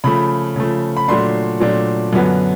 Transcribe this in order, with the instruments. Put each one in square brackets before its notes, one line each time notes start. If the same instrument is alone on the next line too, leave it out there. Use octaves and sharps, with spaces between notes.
[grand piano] C#3 F3 A3 B5
C#3 F3 A3
B5
A#2 F#3 A3 D4 C6
A#2 F#3 A3 D4
F#2 D3 F#3 B3